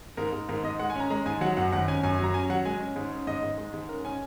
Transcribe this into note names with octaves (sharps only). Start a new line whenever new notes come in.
G#2 A#4
G#2
G#2 A#4
G#2 D#5
G#3 F#5
G#5
C#4 A#5
G#3 A#5
G#2 G#5
F#3 F#5
F#2 F#5
G#1 F#5
C#4 G#5
F#2 G#5
G#5
F#3
A#5
C#4 G#5
F#3 F#5
G#3 G#5
C#4
G#2
C#4
G#2 D#5
G#2
G#3
G#2
C#4 A#4
C#4 G#5